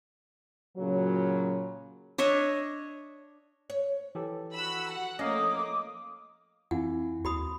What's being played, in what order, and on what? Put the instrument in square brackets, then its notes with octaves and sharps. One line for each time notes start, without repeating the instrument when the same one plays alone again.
[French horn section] A#2 C#3 F#3
[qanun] D4 C#5 D#5 E5
[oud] C#5
[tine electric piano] E3 G4 A4
[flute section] F#4 [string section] B5 E6
[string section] F#5
[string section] F3 A3 A#3 [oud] C#4 [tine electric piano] D#5 F5 [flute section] D6 D#6
[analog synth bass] F2 [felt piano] E3 [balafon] C4 F5 [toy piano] F#5
[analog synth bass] D#2 [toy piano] F#4 B5 D#6